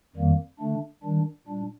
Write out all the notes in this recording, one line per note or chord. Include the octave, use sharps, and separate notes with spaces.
F2 D#3 G3 A#3
D3 A3 D4
D#3 G3 D4
A#2 G3 D4